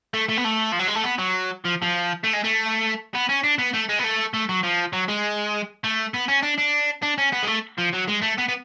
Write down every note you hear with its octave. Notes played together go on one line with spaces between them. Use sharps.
A3
A3
B3
A3
F3
F#3
G#3
A3
B3
F#3
F3
F3
A3
G#3
A3
B3
C#4
D4
B3
A3
G#3
B3
A3
A3
F#3
F3
F#3
G#3
A3
B3
C#4
D4
D4
D4
C#4
B3
G#3
A3
F3
F#3
G#3
A3
B3
B3